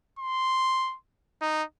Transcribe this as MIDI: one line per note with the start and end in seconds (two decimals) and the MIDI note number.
0.19 0.95 84
1.41 1.63 63